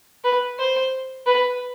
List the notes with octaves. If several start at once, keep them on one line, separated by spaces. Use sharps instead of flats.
B4
C5
B4